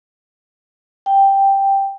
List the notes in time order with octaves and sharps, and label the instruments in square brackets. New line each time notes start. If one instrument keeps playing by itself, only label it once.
[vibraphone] G5